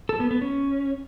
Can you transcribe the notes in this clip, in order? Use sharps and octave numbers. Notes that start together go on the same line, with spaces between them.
A4
B3
B3
C#4